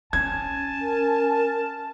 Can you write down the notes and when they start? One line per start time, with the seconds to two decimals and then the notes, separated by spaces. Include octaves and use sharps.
0.13 C#4 G#5 A5 G#6
0.81 A#4